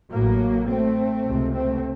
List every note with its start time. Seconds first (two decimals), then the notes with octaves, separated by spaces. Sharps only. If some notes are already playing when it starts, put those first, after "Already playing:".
0.11 A1 A2 F#3 A#3
0.68 A3 C4
1.26 C#2 C3
1.53 A3 C4